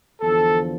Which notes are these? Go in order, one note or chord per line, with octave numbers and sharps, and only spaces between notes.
E2 D3 F3 A4